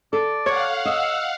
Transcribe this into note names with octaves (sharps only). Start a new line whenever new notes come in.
A4 D5
C#5 F5 F#5
D#5 E6